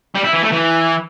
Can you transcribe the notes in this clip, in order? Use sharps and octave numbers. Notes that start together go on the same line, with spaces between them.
G3
E4
E3
A3
E3